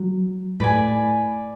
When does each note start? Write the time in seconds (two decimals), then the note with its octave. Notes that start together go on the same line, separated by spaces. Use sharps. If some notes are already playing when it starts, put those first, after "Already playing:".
Already playing: F#3
0.60 A2 B4 D5 G#5